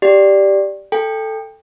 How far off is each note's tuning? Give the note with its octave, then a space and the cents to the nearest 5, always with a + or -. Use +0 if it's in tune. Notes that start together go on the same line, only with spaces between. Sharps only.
G4 +0 D5 +0
A4 +0 G5 +25